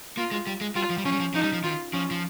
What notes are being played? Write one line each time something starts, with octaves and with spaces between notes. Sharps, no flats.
A#3 F4
G#3
G3
G#3
G3 F4
F3
G3
F3 C#4
G3
F3
F3 D#4
G3
F3
D#3 F4
F3 C#4
F3